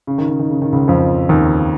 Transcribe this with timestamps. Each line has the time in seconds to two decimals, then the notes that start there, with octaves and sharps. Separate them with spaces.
0.07 C#3
0.18 D#3
0.28 C#3
0.39 D#3
0.50 C#3
0.62 D#3
0.73 C#2 C#3
0.88 F2 F3
1.29 D#2 D#3